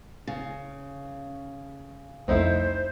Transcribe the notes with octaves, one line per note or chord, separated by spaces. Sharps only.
C#3
C2 F2 A3 C4 D#4 E4 C5